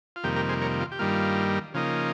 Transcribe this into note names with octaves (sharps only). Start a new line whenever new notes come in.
F4
F2 C3 D#3 G3 A#3 G4
G4 A#4
G#4 C5
A#4 C#5
F4
G4
G2 D#3 G3 A#3 F4
C#3 F3 A#3 D#4